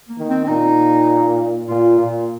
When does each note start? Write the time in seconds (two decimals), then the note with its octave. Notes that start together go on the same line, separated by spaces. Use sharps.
0.09 A#3
0.18 D#3
0.29 C4
0.45 C4
0.48 A#2 D#4
1.68 A#2 F4
1.99 A#2